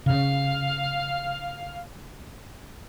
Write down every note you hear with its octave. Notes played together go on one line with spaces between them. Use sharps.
C#3 F5